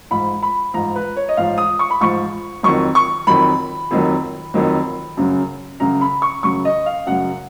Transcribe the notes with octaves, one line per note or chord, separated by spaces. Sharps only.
G#2 F3 B5
B5
G#2 F3 A#5
B4
C#5
D#5
G#2 F3 F5
D#6
C#6
B5
G#2 F3 C#6
F2 D#3 F#3 C#6
C#6
F2 D#3 F#3 B5
F2 D#3 F#3
F2 D#3 F#3
F#2 C#3 F#3
F#2 C#3 F#3 A#5
B5
C#6
F#2 C#3 F#3 C#6
D#5
F5
F#2 C#3 F#3 F#5